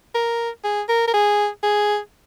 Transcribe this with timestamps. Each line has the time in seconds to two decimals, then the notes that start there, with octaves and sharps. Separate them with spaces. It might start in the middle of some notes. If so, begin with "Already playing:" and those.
0.15 A#4
0.64 G#4
0.89 A#4
1.07 A#4
1.14 G#4
1.63 G#4